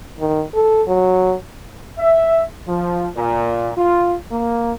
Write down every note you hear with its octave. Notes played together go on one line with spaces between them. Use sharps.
D#3
A4
F#3
E5
F3
A#2
F4
A#3